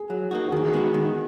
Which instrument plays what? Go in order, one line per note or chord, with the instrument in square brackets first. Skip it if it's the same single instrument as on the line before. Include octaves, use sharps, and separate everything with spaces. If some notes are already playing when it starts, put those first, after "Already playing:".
Already playing: [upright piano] G#4
[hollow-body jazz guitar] F#3
A#3 D#4 F#4
[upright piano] F#4
[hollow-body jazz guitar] D#3 [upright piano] G#4
[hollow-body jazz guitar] G#3 B3 D#4 F#4
D#3